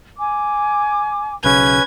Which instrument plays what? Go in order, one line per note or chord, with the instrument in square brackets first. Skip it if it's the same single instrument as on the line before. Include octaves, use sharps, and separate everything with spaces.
[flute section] G#5 D6
[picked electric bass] B1 C#3 [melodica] C#4 B4 [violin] G#6